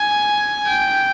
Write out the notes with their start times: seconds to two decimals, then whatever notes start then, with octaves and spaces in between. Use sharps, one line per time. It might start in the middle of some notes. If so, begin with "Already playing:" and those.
Already playing: G#5
0.68 G5